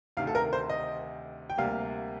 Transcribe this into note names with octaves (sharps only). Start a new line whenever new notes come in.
D2 C3 D#3 F5
A4
A#4
C5
D#5
G5
D2 C3 G3 A#3 F5